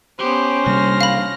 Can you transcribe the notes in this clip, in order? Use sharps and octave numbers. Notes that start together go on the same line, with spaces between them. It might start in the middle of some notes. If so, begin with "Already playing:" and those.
B3 C#4 G4 C5
C3 G3 A#3 F6 A#6
F5 B5